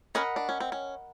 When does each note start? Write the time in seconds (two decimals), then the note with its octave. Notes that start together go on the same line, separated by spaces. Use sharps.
0.15 C#4 A#4 D#5 F#5 B5
0.36 D4
0.49 C#4
0.60 C4
0.72 C#4